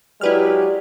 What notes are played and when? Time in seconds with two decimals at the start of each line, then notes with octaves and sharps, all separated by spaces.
0.21 F#3 G#3 E4 G4 B4 D5 F6